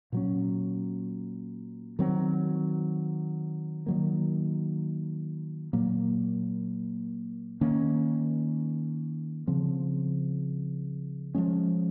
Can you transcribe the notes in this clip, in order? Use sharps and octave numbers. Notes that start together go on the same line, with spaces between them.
A#2 F#3 C#4
D#3 F#3 C4
D#3 F#3 A#3
A#2 F#3 A#3
D#3 A#3 C#4
C#3 F3 C4
F3 G#3 C#4